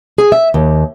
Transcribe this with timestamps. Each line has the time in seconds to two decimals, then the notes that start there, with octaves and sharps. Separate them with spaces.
0.18 G#4
0.32 E5
0.54 D#2